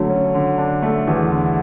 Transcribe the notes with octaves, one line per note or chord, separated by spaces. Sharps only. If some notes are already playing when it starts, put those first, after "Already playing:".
Already playing: D3 F#3 A3
C#4
D3
D4
A3
E2
D3